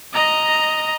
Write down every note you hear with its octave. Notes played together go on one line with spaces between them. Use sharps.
D#5 A#5